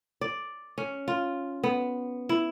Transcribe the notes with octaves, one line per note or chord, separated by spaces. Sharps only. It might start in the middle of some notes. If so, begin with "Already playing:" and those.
D5
C#4
F4
B3
E4